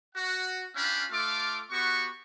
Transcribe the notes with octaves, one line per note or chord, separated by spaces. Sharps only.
F#4 F#5
C#4 D4 F4 F5 G5 B5
A3 F4 A4 F5 D6
B3 F#4 G4 C#6